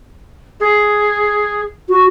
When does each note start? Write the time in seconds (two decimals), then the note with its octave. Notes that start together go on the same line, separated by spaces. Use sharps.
0.60 G#4
1.89 F#4